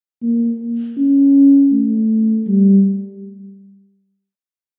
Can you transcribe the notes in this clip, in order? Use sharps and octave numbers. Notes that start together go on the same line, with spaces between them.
A#3
C#4
A3
G3